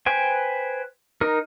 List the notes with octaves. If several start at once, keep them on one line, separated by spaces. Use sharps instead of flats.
B4 C5 G5 G#5
D#4 A#4